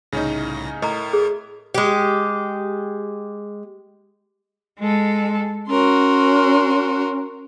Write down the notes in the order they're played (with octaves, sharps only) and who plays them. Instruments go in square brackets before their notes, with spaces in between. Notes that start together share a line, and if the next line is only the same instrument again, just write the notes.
[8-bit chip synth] C2 A2 A#6 [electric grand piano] C#3 C#4 D#4
[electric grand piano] A2 [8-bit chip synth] A#4 [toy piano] D#5 A#5
[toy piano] G#4
[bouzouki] G#3 G4
[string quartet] G#3 A4
[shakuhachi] C#4 [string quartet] F#4 A#4 C6